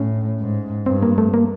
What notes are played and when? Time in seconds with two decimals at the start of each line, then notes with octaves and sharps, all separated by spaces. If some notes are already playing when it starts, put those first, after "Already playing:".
Already playing: A2 C#4
0.40 G#2
0.86 G2 C4
1.03 A#3
1.18 A3
1.34 A#3